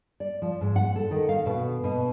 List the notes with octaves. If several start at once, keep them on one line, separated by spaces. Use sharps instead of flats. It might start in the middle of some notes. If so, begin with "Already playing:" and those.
D5
F3
G#2
F#5
A4
D#3
F5
B2
B2